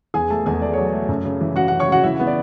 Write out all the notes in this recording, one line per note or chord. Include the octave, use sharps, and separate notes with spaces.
E2 G#4 G#5
A3 A4 A5
E2 G#4 G#5
A3 D5
F#3 C#5
A3
F#2
C#3
E3
C#3 F#4 F#5
C#3 F#4 F#5
C#5 C#6
C#3 F#4 F#5
E3 E4 E5
B3
D5